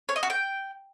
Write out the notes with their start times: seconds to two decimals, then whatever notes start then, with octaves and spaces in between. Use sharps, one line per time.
0.09 C#5
0.16 D#5
0.23 F#4
0.30 G5